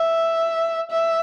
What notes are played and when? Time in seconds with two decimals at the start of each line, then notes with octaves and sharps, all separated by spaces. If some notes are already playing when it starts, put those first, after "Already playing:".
Already playing: E5
0.91 E5